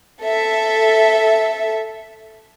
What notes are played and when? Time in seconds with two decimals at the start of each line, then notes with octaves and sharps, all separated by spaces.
0.23 A4 E5